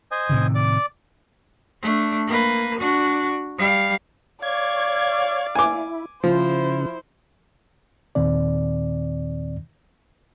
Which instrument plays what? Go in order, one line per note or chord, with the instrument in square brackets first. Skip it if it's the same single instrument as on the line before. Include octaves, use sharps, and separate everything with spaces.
[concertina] C5 D#5 G#5
[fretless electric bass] A2 C3 D#3
[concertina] D5 D6
[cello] A3 D4
A#3 B4
D4 F#4
G3 F5
[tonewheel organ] C#5 G#6 [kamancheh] D5 F5
[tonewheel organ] E4 [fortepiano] G#5 D6
[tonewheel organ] C#3 [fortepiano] F3 [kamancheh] E4 C5
[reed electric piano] D#2 A#2 D#3 C4 D5